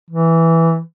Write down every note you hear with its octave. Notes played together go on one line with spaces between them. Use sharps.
E3